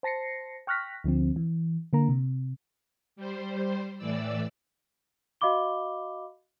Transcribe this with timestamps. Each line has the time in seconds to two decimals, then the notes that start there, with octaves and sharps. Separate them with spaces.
0.03 C5 A5 A#6 C7 C#7
0.67 G5 C#6 F6 F#6 A#6 B6
1.04 D2 D3 F3 C4
1.36 E3
1.93 D3 A#3 A#5
2.09 C3
3.16 G3 C5
3.98 A2 E3 D5 E6
5.41 F#4 D#5 F5 B5 D6 G7